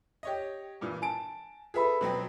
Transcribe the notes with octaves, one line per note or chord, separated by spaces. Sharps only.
G4 C#5 D#5
G2 A#2 E3
G#5 A5 D7
F4 G#4 A4 B4 E5 B5
B2 F#3 C4